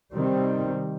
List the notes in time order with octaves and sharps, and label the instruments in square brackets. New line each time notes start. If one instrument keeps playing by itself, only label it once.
[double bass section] C3 D#3 G3 C4